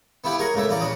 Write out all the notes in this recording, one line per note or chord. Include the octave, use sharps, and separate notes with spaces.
B3 E4 F4 G4 B4
G#4 A#4 C#5 F#5 G#5 A#5
C#2 C#3 A3 A#3 E5
E2 C#4 F4 D5 A#5
A#2 C#3 F#4 D#6